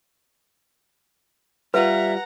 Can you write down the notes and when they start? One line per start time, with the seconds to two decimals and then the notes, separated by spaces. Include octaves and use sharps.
1.74 G3 F4 B4 E5 F#5 A#5